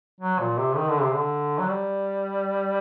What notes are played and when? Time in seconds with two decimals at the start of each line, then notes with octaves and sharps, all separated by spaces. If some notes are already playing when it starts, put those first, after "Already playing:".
0.21 F#3
0.39 A#2
0.58 C3
0.77 D#3
0.89 D3
1.01 C3
1.15 D3
1.59 F#3
1.69 G3